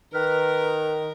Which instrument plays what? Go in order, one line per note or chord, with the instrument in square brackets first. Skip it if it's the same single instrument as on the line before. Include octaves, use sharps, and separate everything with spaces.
[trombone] D#3 [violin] A#4 [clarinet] B4 [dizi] F6